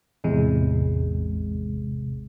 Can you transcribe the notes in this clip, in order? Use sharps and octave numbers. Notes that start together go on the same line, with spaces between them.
A1 E2 C3 G#3